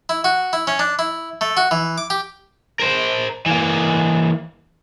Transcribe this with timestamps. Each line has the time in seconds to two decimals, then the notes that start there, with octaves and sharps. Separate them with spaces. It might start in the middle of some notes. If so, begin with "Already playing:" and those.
0.09 E4
0.24 F#4
0.53 E4
0.67 C#4
0.79 D4
0.99 E4
1.41 A3
1.57 F#4
1.71 E3
1.98 D6
2.10 G4
2.80 A#4 C5
3.46 E3 A#3